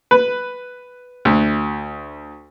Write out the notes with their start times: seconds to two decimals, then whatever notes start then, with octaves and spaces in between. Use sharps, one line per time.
0.11 B4
1.25 D2